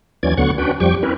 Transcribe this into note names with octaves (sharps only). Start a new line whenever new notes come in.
D#2 E3 F#3 C#4 D5 G#6
D2 D3 F#3 B3 F#5 C#6
C#4 D4 F#4 B4 G5
F2 F3 G3 G4 G5 C#6
C4 C#4 E4 A#4 B4